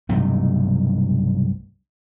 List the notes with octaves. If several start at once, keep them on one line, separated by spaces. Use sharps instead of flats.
B1 G2 C3 A3